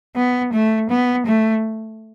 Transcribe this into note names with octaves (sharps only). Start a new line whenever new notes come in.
B3
A3
B3
A3